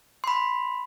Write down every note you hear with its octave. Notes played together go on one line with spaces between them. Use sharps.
B5 C6